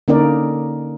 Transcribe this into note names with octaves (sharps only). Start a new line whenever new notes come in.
D3 A#3 C#4 D#4 A#4 D5